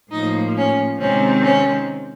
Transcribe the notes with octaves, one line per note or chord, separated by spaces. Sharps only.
A2 F3 A#3 D#4
C#4
C3 D#3 G#3 C4 C#4
C#4